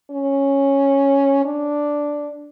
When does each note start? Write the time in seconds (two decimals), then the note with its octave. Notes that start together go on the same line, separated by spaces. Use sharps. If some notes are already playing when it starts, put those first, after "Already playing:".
0.11 C#4
1.45 D4